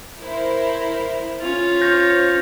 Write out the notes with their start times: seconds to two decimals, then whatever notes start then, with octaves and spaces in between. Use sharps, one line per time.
0.19 E4 A#4 C5
1.41 C#4 F4
1.81 C5 C#5 F6 G6 A#6